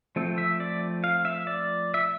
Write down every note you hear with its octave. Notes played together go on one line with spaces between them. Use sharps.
F3 A3 C4
E5
D5
F5
E5
D5
E5